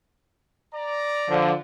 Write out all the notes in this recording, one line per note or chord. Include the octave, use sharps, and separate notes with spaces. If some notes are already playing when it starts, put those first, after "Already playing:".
D5 A#5
D3 F3